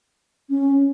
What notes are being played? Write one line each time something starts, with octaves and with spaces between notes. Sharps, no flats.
C#4